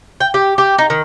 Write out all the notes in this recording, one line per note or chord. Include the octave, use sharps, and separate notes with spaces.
G5
G4
G4
D#4
D#3